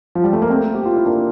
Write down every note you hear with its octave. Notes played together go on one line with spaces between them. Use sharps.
F3
G3
A3
A#3
A3 C4
G4
F4
E4
A#3 D4